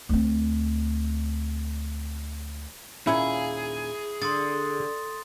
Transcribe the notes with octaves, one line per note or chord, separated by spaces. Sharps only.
D2 C4
D#2 A#2 C#4 E4 G#4
D3 C6 D#6 A6